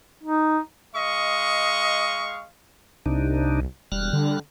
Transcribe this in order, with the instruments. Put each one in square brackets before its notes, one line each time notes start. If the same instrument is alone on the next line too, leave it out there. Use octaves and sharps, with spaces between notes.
[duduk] D#4
[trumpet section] G#3 D#5 F5 C#6
[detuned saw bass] C2 [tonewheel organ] C3 D4 D#4
[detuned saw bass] E1 [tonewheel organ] G3 F6 F#6
[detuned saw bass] D3